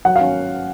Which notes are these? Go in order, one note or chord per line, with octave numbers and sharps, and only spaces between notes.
F#3 F#5
F5
C#4